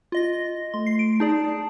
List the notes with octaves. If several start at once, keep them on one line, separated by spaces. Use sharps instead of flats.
F4 D#5 A#6
A3 C6
C7
D7
D#4 G#4 D5 A5